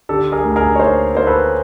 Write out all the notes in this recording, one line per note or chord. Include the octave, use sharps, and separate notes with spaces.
D3 G4 A4
G#4 A#4
D2
G#4 A#4
C#5
A#3 A#4 C5
A#3 C5
A4 B4